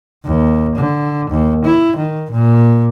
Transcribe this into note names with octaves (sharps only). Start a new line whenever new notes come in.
D#2
D3
D#2
E4
D#3
A#2